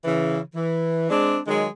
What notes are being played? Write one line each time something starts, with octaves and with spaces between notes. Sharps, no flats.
C#3 E3
E3
G#3 C4 D4
D#3 F#3 G#3